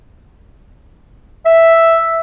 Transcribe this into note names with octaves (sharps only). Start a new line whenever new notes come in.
E5